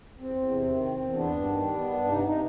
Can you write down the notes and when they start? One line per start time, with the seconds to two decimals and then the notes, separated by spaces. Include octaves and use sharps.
0.20 E2 C4
0.35 E2
0.51 C3
0.67 D#3
0.83 E2
0.99 E2
1.14 B3 D4
1.30 G2
1.45 D#3
1.62 G3
1.77 B3
1.93 G2
2.09 C3 D#4
2.25 C3 D#4